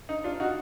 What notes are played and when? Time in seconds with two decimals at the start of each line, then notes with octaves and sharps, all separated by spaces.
0.09 D#4
0.24 D4 F4
0.40 D#4 F#4